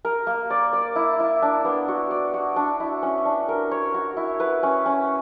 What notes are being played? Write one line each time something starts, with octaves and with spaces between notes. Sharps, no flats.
A#4
A#3
D5
D5
E4
E4
D4
B3
F#4
D5
F#4
D4
E4
C#4
D4
A#4
C#5
F#4
E4
B4
C#4
C#4